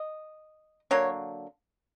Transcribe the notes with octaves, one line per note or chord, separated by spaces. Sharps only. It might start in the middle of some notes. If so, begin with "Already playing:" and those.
Already playing: D#5
D3 F#3 A#3 C#5